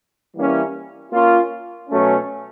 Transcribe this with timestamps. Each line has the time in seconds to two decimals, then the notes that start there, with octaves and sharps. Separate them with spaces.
0.36 E3 G3 A#3 C#4 E4
1.13 A#3 C#4 F4
1.90 B2 F#3 A3 C#4